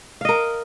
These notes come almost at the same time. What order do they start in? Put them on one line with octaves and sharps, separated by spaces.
F5 D#5 A#4